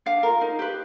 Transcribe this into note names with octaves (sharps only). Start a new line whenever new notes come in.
D4 F5
F4 A#4
D#4
G4 B4